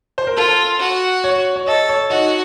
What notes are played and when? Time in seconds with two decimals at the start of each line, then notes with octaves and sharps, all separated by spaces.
0.18 C5
0.27 A#4
0.36 F4 A4
0.80 F#4
1.24 C#5
1.56 C#5
1.67 A4 D#5
1.89 C#5
2.10 D#4 F#4